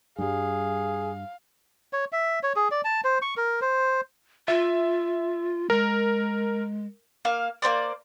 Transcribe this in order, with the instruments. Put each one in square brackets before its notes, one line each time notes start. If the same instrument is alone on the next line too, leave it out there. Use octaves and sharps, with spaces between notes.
[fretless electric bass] G2 G3 [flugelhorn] G#4 [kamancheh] F5
[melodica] C#5
E5
C#5
G#4
D5
A5
C5
C#6
A#4
C5
[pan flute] F4 [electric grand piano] E5
[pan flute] G#3 [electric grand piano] A#4
[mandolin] A#3 F5
A#3 C4 C5 D5